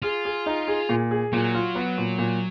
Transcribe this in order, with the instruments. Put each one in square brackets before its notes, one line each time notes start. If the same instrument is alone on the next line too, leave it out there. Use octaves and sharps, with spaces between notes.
[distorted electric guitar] F4 [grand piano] G#4
[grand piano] G#4
D#4
G#4
A#2
G#4
[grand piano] A#2 [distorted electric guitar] F#3
[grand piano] F4
B3
A#2
A#2